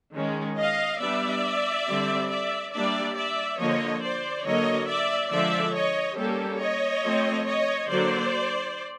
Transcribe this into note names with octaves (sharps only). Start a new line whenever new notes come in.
D#3 G#3 C#4
D#5 F5
G3 B3 D4 D5 E5
D3 G3 C4
D5 E5
G3 A#3 D4 D5 E5
D5 E5
D3 F3 A#3 C#5 D#5
C5 D5
D3 F#3 A#3 C#5 D#5
D5 E5
D3 F3 G#3 D5 E5
C#5 D#5
G3 A#3 C#4 G4 A4
C#5 D#5
F3 A3 C4
C#5 D#5
D3 F#3 A#3 D4 C5 D5